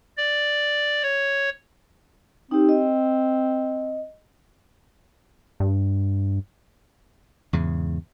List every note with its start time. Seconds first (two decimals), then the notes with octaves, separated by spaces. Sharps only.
0.17 D5
1.03 C#5
2.51 C4 D#4 G4
2.69 D#5
5.60 G2
7.53 E2 G#2 C#3